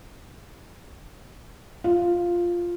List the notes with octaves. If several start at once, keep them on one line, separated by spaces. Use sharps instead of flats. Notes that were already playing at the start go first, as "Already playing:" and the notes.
F4